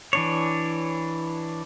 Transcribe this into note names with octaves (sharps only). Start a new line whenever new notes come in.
E3 D4 C#5